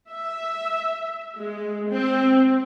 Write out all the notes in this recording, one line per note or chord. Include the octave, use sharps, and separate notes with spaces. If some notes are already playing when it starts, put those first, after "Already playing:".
E5
G#3
C4